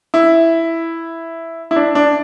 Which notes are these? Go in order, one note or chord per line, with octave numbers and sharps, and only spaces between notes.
E4
E4
D4
D4